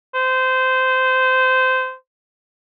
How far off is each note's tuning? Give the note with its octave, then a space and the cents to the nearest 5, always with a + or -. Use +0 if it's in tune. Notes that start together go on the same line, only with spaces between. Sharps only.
C5 -20